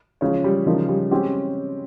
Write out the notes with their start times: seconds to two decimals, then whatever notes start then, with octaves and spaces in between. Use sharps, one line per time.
0.21 C#3 F3 G#3 C#4 G#4 C#5
0.44 G3
0.66 C#3 F3 G#3 D#4 A#4 C#5
0.89 G3
1.11 G#3 C4 C#4 G4